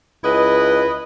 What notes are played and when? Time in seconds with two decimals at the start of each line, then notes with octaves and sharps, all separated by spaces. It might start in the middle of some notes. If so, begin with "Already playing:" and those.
0.24 C#2 E4 B4 D#5